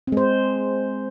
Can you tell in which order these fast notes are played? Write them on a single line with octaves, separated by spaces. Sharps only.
C4 G#3 C5